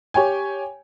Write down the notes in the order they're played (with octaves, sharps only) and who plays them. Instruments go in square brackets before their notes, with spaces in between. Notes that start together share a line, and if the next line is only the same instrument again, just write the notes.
[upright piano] G4 C#5 G5 G#5